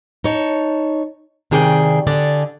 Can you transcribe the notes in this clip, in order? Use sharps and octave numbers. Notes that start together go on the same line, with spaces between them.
D#4 C#5 A5
C3 D#3 G#4 D5 G5
D3 G#4 D5